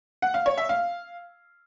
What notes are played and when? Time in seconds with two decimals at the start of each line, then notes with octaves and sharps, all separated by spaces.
0.22 F#5
0.34 F5
0.46 C#5
0.58 E5
0.69 F5